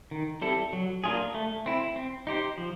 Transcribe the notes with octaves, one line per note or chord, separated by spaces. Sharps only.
D#3
G3 C4 E4 A4
F#3
A#3 D4 F4 G#4
A3
C4 E4
C4
D#4 G4 C5
F3